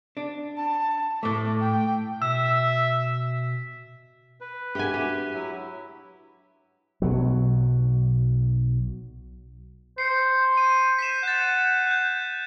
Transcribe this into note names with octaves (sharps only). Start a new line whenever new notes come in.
D4
A5
A2 A3 D6
G5
B2 E5 E6
B4
D4 G4 E5 F#5 G#5
F#4 G4 E5
F#3 E4
B1 F#3
C5 C7 C#7
D#7
B6 C7 E7
F#5 G6 A6
F#6 G6